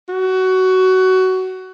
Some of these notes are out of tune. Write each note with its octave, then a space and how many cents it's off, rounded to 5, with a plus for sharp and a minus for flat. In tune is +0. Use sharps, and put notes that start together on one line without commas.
F#4 +20